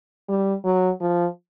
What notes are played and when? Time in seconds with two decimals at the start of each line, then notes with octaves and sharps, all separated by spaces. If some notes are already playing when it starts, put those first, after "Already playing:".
0.29 G3
0.64 F#3
1.00 F3